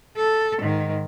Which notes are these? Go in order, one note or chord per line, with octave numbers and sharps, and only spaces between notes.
A4
G#2 D#3